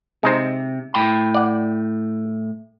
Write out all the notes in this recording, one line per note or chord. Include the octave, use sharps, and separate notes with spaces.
C3 G#3 D#4 C5
A2 G5 B5
D5 F#5